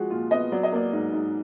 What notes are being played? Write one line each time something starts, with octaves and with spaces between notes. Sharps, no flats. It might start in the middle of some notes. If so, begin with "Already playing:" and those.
Already playing: F3 G#3 F#4
A#2 F4
B3 D#5
F#3 D5
D#5
A#3 D5
G#2
G#2